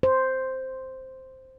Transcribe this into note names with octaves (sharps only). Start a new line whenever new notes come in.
C5